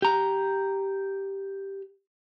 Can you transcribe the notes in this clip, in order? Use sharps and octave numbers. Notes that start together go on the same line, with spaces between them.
G4 A#5